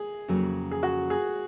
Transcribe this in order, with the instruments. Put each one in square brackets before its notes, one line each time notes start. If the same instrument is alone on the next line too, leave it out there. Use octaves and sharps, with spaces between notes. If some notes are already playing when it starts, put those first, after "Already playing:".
Already playing: [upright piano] G#4
[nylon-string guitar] F2 C#3 F#3 A#3 C#4
[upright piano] G#4
F#4
G#4